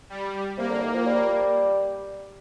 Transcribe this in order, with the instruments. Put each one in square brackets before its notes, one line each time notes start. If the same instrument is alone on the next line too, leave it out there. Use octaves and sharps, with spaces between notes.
[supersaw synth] G3
[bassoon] C3 [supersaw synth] A#3
[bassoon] D3
D#3
F3
G3